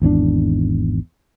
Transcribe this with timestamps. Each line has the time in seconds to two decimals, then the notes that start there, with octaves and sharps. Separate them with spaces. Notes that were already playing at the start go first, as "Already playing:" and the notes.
0.02 G#1 E2 C#4 D4